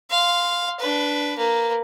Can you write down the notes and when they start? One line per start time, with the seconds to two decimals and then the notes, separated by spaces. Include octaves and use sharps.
0.10 F5 C6
0.80 D4 B4
1.37 A#3 B4